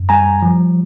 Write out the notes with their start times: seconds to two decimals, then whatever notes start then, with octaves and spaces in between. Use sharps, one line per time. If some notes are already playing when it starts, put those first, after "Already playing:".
Already playing: F#2
0.09 G3 G#5 A#5
0.42 F3